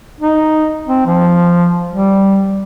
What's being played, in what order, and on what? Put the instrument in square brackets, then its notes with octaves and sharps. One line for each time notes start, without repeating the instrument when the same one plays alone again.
[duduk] D#4
C4
F3
G3